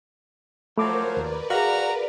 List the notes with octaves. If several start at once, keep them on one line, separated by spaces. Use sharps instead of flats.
F3 F#3 A3 A#4 C5 E5 B5 D6
D#2 A#4 B4 D5
F#4 G#4 E5 F5 A#5